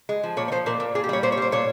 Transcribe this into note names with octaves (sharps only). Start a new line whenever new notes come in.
G#3
F3
A#2 C#5
C#5
F3 C5
A#2 A#4
A#2
A#2 G#4
G4
G3 C#5
A#2 C5
C#5
G3 C5
A#2 C#5